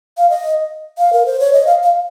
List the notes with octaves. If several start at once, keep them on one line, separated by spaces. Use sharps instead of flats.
F5
D#5
F5
A#4
C5
C#5
D#5
F5
F5